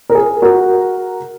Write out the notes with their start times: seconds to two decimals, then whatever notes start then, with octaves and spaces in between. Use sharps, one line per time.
0.10 A#4
0.15 G#4
0.42 F#4 A#4